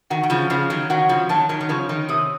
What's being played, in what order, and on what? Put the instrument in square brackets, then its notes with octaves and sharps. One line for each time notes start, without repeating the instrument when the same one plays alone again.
[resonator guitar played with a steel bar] D#3 [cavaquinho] F#4
[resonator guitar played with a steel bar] D#3
C#3 F3
[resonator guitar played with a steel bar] C#3 F3 [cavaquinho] F5
[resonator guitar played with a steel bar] D#3 F#3
[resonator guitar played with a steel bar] D#3 F#3 [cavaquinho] F#4
[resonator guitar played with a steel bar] C#3 F3
[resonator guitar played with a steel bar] D#3 F#3 [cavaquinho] A5
[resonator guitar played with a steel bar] D#3 F#3
D#3
[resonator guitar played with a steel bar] C#3 F3 [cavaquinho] C#5
[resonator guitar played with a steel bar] D#3
[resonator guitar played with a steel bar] C3 [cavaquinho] D#6